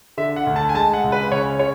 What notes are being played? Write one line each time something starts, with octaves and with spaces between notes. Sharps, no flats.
D3 E5
F#5
D2
A5
G#5
G#3 A5
F#5
C#2
B4
C#3 C#5
C#5